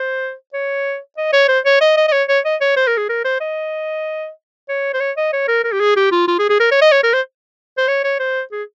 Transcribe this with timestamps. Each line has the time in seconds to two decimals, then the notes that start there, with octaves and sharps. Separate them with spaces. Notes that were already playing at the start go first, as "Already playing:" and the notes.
Already playing: C5
0.54 C#5
1.17 D#5
1.33 C#5
1.48 C5
1.65 C#5
1.81 D#5
1.97 D#5
2.08 D#5
2.12 C#5
2.29 C#5
2.45 D#5
2.61 C#5
2.76 C5
2.87 A#4
2.97 G#4
3.09 A#4
3.25 C5
3.40 D#5
4.69 C#5
4.93 C5
5.00 C#5
5.17 D#5
5.33 C#5
5.48 A#4
5.64 A#4
5.72 G4
5.80 G#4
5.96 G4
6.12 F4
6.28 F4
6.39 G#4
6.49 G#4
6.60 A#4
6.71 C#5
6.81 D#5
6.92 C#5
7.03 A#4
7.13 C5
7.77 C5
7.88 C#5
8.04 C#5
8.20 C5
8.52 G#4